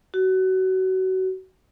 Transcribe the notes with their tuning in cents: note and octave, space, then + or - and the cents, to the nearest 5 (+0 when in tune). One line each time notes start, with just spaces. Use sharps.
F#4 +25